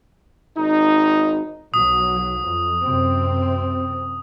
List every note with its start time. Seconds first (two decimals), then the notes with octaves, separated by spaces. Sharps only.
0.57 G#1 D#4
1.74 B1 F#3 D#6
2.44 F2
2.84 F#2 C3 C4